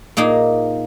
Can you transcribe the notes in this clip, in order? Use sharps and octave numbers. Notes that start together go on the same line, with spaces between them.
A#2 A#3 D#4 G#4